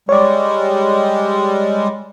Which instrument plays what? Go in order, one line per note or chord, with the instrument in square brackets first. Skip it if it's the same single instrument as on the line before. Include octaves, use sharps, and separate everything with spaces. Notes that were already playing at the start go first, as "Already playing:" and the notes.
[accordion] G3 G#3 [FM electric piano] C#5 D5